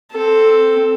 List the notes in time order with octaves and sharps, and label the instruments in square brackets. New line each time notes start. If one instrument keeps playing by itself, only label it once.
[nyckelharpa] C4 A4